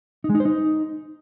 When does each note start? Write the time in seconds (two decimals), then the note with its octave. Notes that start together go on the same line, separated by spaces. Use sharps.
0.24 D#4
0.30 G#3
0.35 D#4
0.40 C5
0.45 D#4